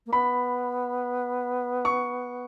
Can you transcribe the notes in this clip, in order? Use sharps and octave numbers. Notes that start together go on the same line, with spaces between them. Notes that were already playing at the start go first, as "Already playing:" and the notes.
A#3
B3 B5
C#6